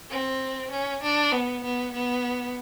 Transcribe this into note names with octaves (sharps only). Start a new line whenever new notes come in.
C4
C#4
D4
B3
B3
B3